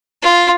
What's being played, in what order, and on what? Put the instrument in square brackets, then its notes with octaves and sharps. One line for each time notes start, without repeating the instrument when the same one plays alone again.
[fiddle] F4